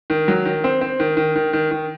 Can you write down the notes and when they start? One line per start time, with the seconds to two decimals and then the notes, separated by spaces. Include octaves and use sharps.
0.10 D#3
0.28 F#3
0.45 D#3
0.64 C4
0.81 C4
1.00 D#3
1.17 D#3
1.36 D#3
1.53 D#3
1.71 D#3